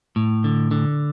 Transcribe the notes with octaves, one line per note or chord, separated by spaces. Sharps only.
A2
D3
D3